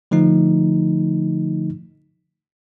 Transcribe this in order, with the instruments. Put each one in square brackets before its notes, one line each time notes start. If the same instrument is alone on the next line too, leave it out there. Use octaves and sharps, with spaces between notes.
[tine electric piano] D3 F3 A3 D#4